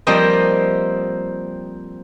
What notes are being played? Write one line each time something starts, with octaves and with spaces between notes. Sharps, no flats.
F3 G3 A#3 C4 D#5